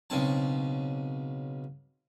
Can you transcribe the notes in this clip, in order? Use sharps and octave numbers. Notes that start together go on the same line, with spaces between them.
B1 C#3 C4 A5